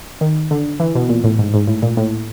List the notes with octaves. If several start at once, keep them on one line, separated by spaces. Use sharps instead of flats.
D#3
D3
E3
B2
A#2
A2
G#2
G#2
A2
A#2
A2